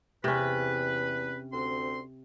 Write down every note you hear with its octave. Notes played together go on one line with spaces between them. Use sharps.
E2 C3 C#4 B4
D2 C4 C6